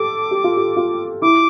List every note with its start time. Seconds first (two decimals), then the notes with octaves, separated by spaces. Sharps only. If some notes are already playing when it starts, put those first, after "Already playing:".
Already playing: G4 A4 D6
0.31 G4
0.44 F4
0.57 G4
0.77 F4
1.22 E4 D6